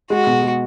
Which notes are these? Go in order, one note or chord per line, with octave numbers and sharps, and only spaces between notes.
G#3 F#4
B2
G#3